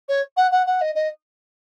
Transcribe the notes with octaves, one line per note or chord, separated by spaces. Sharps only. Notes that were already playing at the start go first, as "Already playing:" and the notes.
C#5
F#5
F#5
F#5
D#5
D#5